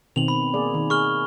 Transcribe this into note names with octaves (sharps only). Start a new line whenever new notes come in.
B2 D#3 C4 F7 F#7
B5
A#3 G#4 D5
D#3
G#4 C#6 F6 G7